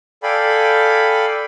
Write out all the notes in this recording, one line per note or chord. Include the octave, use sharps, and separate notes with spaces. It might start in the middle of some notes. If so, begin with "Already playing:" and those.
A4 D5 F5 G5 G#5 B5